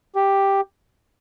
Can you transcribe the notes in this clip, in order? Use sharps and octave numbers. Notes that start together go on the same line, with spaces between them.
G4